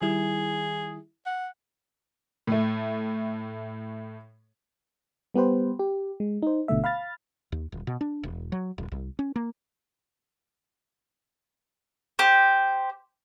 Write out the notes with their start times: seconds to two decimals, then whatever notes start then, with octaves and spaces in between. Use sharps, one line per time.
0.02 D#3 G3 E4 G#4
1.26 F#5
2.47 A2 A3
5.34 G3 B3 G4 B4 C5
5.79 G4
6.20 G#3
6.42 D#4 C5
6.68 G#1 B2 D3 A3 E5
6.84 F5 B5 F6 A6
7.52 D#2
7.72 D#1
7.87 B2
8.01 D4
8.23 E1
8.52 F#3
8.78 D#1
8.92 C2
9.19 C#4
9.36 A#3
12.19 G4 C5